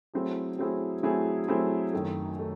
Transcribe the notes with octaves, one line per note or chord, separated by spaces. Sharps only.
F#3 A3 C4 E4 G#4
F#3 A3 C4 E4 G#4
F#3 A3 C4 E4 G#4
F#3 A3 C4 E4 G#4
F#2 D#3 A3
D#3 A3